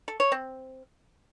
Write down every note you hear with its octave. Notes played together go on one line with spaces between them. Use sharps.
A4
C#5
C4